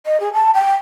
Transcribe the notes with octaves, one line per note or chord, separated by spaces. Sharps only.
D#5
G#4
A5
G5